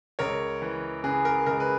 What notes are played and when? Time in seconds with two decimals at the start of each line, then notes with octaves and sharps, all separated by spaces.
0.19 C#2 A#4 C#5
0.62 E3
1.04 C#3 G#4 B4
1.25 A#4
1.46 C#2 A#4
1.60 B4